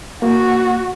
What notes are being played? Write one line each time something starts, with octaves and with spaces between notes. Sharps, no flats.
A#3 F#4